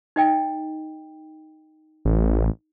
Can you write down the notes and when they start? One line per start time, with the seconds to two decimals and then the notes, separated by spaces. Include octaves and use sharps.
0.16 D#4 D#5 G5
2.05 A1